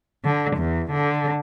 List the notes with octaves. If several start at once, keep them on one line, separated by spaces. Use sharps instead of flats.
D3
E2
D3